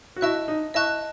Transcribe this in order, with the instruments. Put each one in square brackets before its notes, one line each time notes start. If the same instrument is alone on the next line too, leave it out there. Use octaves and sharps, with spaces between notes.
[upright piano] F#4
[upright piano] E4 [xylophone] D#5 A5 C#6 F#6
[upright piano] D#4
[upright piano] E4 [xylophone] D#5 A5 C#6 F#6